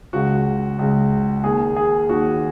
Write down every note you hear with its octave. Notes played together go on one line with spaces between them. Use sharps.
C#2 C#3 F#4
C#2 C#3
D#2 D#3 G#4
G#4
D#2 D#3 F#4